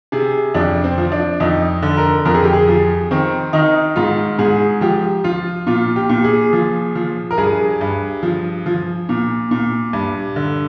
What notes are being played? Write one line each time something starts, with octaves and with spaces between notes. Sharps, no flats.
C3 G#4
F2 D4
C4
F3
D4
F2 D#4
D3
A#4
F2 A#4
G#4
G4
G#4
F3
D#3 C4
D#3 D#4
G#2 F4
G#2 G#4
F3 G4
F3 F4
A#2 F4
G4
A#2
G#4
F3
F3
A#4
G2 G#4
G2
F3
F3
A#2
A#2
G2
D3